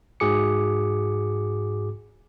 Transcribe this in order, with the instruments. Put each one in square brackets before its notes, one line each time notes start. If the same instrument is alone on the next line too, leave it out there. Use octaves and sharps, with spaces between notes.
[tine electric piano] G#2 F#4 G#4 D6 C#7